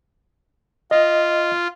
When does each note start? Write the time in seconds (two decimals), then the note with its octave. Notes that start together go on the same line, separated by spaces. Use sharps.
0.91 F4 D#5